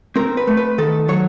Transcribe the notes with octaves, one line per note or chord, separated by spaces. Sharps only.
C4 A#4
B4
A3
B4
D#3 A4
F#3 C#5